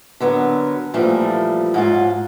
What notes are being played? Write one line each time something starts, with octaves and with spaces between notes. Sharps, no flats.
D3 F#3 B3 A#4
A#2 E3 F3 G3 A3
G#2 F#3 F4